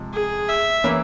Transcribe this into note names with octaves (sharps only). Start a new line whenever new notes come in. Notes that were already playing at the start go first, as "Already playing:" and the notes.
Already playing: C3 F3 G#3
G#4
E5
E3 A#3 C#4 E4